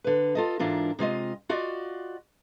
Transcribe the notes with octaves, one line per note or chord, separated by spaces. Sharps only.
D3 B4
F4 A4 D#5
G#2 E3 D4 F4 A#4
C3 G#3 F4 D#5
F4 F#4 D5 D#5